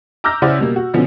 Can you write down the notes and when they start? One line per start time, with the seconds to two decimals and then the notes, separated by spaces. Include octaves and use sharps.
0.24 A#5 D6 E6 F6 G6 A#6
0.42 C#3 C#4 E4 C5 D5 F#5
0.58 B2 G3 A#3
0.76 F#4
0.94 B2 D3 F3 B3 C#4